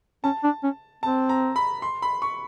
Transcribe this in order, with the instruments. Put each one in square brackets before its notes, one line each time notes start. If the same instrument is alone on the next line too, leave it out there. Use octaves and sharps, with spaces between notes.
[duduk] C#4 [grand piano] A5
[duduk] D4
C#4
[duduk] C4 [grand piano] A5
[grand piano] A#5
B5
C6
B5
C#6